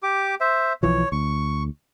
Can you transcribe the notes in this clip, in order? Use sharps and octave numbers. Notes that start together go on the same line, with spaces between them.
G4 D6
C5 E5
B1 E3 F3 C#5
D2 C#6